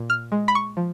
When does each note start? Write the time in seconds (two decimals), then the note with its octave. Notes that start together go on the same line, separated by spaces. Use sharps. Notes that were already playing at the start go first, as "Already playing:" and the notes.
Already playing: A#2
0.10 F6
0.32 G#3
0.48 B5
0.55 C#6
0.77 F3